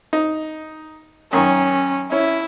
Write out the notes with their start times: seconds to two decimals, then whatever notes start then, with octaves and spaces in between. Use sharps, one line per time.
0.13 D#4
1.33 F#2 D#3 C#4
2.12 C#4 E4